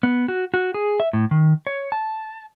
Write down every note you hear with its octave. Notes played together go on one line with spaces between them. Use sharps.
B3
F#4
F#4
G#4
E5
A2
D#3
C#5
A5